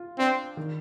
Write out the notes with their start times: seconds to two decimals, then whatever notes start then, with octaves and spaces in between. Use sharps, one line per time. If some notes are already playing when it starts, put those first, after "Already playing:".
Already playing: F4
0.18 C4 D4
0.57 D#3